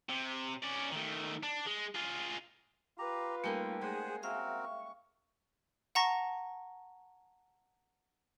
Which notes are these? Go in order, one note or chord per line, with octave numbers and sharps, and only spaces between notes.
C3
C#4 D5
D#3 A3
D4
G#3
F4 G#4
F4 G4 B4 A#5
G3 A3 A#3 C#4 D#4 A4
G#3 G#4 C5 F#5
C4 F#4 A#4 E5 F5 G5
C#6
F#5 A5 A#5 C#6 A#6